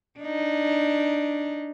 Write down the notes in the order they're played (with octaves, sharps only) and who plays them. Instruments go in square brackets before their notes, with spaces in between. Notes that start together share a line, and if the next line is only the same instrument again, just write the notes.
[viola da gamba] D4 D#4